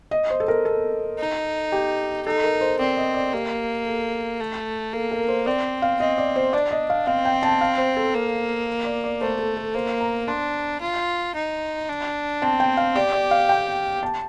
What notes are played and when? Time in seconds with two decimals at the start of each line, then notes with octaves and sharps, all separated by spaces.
0.11 D#5
0.30 C5
0.40 A4
0.48 A#4
0.65 A4
1.19 D#4
1.72 G4
2.26 D#4 A4
2.44 A#4
2.61 C5
2.79 C4 D5
2.97 D#5
3.14 D5
3.33 A#3 G4
3.86 A4
4.40 A3
4.93 A#3 A4
5.11 A#4
5.28 C5
5.46 C4 D5
5.82 F5
6.00 C4 D#5
6.18 D5
6.36 C5
6.53 D4 D5
6.71 D#5
6.90 F5
7.07 C4 F5
7.25 G5
7.43 A5
7.61 F5
7.78 C5
7.97 A4
8.14 A#3
8.85 D5
9.04 D5
9.21 A3 C5
9.39 A4
9.57 A4
9.75 A#3 C5
10.01 A#5
10.28 D4 C6
10.81 F4
11.35 D#4
11.89 D4
12.42 C4 A5
12.60 G5
12.77 F5
12.96 G4 D5
13.13 D5
13.31 F5
13.49 G5
14.03 A5